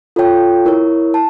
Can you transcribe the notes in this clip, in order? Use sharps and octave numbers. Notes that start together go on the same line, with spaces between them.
F4 A4 C#5 G5
E4 A#4 C#5
A5